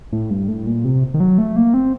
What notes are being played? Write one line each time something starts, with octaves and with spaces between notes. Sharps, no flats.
A2
G2
A2
A#2
C3
D#3
F#3
A3
A#3
C4